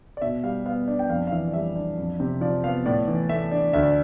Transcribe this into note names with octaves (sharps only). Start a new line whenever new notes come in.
D5
B2 E5
G3 F5
B3 F5
D4
G5
F2 F5
F5
E3 E5
D5
G3 E5
D4
F2
C3
F3 D5
B3 F5
A2 D5
E3
A3 E5
D4
D2 E5
D5